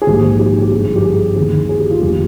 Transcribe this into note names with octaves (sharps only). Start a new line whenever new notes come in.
G#4
A#1 G#2 D#3 G4
G4
G4
G1 G2 D3 F3 G#4
G4
G#4
D#2 D#3 G#4
G#4
G4
F4
F1 D#2 D3 F3 G4